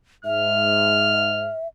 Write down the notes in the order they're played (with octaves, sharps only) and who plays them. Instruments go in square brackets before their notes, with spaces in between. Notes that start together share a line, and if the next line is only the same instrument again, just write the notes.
[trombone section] G#2 [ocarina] E5 [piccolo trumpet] F6